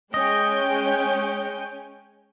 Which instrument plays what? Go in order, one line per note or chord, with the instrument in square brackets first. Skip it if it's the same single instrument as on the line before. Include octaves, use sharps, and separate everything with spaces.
[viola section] G#3 G5 [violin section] C#4 [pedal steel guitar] D#5